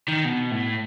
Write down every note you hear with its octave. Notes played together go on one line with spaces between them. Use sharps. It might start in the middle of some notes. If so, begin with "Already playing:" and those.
D#3
B2
A2